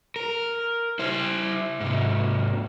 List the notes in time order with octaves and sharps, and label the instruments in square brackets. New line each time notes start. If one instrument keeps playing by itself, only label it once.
[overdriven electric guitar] A#4
E4 C5
G#2 C3